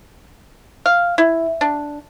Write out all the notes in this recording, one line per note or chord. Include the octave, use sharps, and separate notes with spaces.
F5
E4
D4